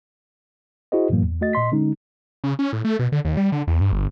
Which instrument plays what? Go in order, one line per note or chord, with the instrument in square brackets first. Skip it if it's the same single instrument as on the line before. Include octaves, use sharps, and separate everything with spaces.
[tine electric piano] E4 F#4 G#4 C5 D#5
F#2 A2 E3 F#3 A#3
E2
A3 F#4 D#5 A6
A#2 D#5 C6 B6
D3 G#3 C#4 D#4
[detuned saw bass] C#3
C#4
A2
A3
B2
D3
D#2
G3
D3
E2
G2
G1